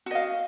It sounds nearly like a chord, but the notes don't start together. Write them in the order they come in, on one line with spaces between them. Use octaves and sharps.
F#4 D#5 F5